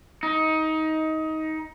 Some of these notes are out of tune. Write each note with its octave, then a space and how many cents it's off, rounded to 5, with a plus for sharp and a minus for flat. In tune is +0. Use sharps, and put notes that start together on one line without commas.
D#4 +20